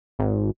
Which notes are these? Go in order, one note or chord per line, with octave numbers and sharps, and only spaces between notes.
G#1